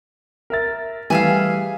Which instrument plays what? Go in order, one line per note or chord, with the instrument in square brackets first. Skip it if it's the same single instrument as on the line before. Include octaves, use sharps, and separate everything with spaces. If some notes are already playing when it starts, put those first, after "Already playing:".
[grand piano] A#4 E5 A6
[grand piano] E3 G3 A3 [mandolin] G#4 E5 F5